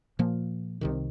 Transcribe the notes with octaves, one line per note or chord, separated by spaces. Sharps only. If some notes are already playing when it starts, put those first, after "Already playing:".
A#2 F3 A#3
C2 C3 D#3